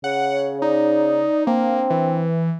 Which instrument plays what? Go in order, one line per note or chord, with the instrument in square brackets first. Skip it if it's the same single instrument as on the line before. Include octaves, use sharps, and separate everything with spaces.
[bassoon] C#3 [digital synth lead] F#5
[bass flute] C#5
[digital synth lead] D#4 [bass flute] D5
[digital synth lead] A#3 [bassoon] C4 [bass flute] D4
[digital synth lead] E3